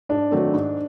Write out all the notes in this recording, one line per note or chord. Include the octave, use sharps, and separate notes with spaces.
G#2 D4
D#3 F#3 A3 C4
G#2